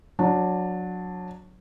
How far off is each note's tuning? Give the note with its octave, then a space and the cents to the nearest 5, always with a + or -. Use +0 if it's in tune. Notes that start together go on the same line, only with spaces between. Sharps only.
F#3 -20 D4 +0